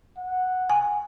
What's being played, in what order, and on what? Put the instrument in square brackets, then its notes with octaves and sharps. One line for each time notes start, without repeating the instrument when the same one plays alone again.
[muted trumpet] F#5
[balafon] G#5